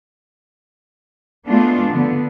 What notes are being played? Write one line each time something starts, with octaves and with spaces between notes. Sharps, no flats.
G#3 A3 B3 D4 F4
D3 B3